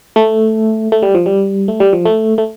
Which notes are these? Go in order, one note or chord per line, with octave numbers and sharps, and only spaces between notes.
A3
A3
G3
F3
G3
A3
G3
F3
A3
A3